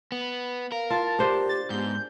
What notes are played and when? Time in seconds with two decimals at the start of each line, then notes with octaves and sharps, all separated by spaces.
0.12 B3
0.72 A#4 F5
0.90 F4 A5
1.19 D4 G4 C5
1.49 A6
1.70 G#2 B3 G6